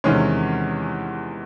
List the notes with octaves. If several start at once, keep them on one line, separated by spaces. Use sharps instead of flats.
E2 C3 D#3 G#3 C#4